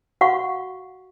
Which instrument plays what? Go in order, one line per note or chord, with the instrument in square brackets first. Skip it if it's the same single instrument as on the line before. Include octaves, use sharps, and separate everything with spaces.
[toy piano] F#4 F5 F#5 C#6